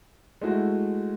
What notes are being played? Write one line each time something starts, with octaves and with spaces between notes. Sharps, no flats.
G#3 A3 E4 F#4